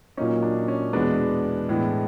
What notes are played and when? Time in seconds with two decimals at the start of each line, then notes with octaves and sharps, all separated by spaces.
0.17 A#2 F#3 A#3 C#4 D#4
0.43 D4
0.68 C#4
0.93 E2 B2 G#3 B3 D4
1.69 A2 E3 G#3 B3